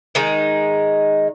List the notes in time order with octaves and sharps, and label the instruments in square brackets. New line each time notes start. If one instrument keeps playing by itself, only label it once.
[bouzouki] D#3 G#3 D#4